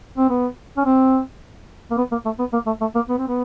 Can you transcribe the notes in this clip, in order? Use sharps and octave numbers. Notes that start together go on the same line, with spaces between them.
C4
B3
C#4
C4
A#3
B3
A#3
A3
B3
A#3
A3
A3
A#3
B3
C4
B3